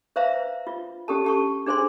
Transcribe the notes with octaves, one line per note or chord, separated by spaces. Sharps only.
B4 C5 E5 F5 A#5
F4
C#4 G4 A4 A5
G4 A5 C#6
D4 G#4 C5 G#5 C6